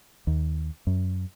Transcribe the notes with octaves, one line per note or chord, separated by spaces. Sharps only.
D#2
F#2